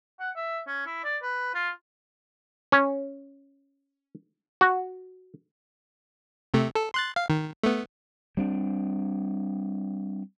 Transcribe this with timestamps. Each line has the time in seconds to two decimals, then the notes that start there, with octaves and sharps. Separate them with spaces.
0.20 F#5
0.36 E5
0.67 C#4
0.86 E4
1.04 D5
1.23 B4
1.54 F4
2.72 C#4
4.61 F#4
6.54 C3 A3
6.75 A4
6.94 C6 F#6 A6
7.16 F5
7.30 D#3
7.63 A3 B3
8.37 G3 C4 D4